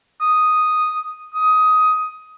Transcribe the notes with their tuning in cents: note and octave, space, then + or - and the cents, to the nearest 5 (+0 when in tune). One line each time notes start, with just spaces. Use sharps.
D#6 +0
D#6 +15